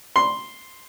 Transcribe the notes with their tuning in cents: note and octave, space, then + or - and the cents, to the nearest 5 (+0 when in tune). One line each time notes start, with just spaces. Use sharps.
C6 +0